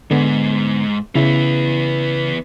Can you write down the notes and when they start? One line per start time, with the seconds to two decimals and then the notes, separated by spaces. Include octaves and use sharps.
0.11 G#2 D3 B3
1.15 C#3 E3 B3 E4